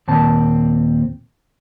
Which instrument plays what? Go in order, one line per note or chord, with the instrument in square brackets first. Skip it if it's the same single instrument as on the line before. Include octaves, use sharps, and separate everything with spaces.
[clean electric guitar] D#2 A#2 C4 A5